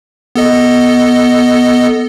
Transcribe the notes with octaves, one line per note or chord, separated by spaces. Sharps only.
B3 A4 D#5